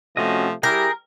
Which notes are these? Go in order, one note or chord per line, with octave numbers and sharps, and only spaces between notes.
C3 F3 A3 C#4 F#4 D#5
G3 E4 G4 G#4 A#4 G6